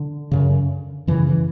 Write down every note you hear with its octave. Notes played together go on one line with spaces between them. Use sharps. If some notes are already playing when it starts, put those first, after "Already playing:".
Already playing: D3
F#2 C#3
F#2 C#3 E3
E3